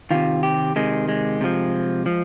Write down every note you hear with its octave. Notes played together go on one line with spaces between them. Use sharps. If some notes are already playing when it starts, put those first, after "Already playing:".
C3 D#3 F4
G4
C3 D#3 G#3
G#3
C3 F3
F3